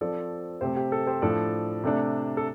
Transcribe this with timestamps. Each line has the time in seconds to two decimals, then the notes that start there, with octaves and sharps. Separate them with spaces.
0.01 F3 C4 A4 D5
0.61 C3 A3 C4 G4 C5
0.77 G4
0.92 A4
1.07 G4 C5
1.22 A2 F3 D4 A4 D5
1.84 C3 A3 D4
2.37 A4